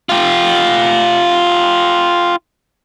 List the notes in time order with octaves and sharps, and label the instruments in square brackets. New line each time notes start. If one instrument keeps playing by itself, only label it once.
[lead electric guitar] F4 G4